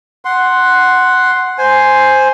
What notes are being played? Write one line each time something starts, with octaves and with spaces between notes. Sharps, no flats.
F#5 C6
C5 G#5